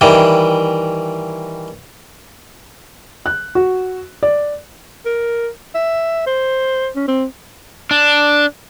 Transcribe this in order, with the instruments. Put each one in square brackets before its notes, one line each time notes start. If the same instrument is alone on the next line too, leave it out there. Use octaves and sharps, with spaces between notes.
[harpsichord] D#3 E3 G3 E4
[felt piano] F#6
F#4
D5
[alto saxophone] A#4
E5
C5
C#4
C4
[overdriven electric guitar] D4